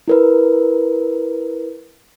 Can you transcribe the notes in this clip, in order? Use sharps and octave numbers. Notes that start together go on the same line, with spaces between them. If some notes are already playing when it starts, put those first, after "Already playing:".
E4 A#4 B4